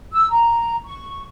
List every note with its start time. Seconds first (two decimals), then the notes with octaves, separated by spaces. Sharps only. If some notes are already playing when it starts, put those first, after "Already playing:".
0.12 E6
0.31 A#5
0.85 C#6